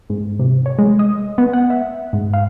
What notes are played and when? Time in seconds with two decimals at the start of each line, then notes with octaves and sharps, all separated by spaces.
0.10 G#2
0.39 C3
0.66 C#5
0.79 G#3
0.99 D#5
1.38 B3
1.53 F#5
1.70 E5
2.13 G#2
2.34 F5